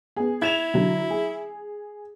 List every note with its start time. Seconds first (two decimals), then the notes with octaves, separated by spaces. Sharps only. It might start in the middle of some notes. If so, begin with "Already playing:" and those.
0.16 B3 G#4
0.42 E4 G#6 E7 F7
0.74 D3 F#3
1.10 G#4